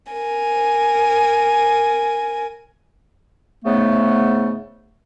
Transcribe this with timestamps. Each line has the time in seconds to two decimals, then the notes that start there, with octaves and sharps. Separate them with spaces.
0.13 A#4 G#5
3.65 G#2 C#3 A3 B3